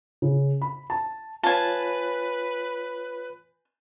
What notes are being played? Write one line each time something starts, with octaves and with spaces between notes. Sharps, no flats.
C#3
B5
A5
F4 B4 C#5 G#5 A5 A6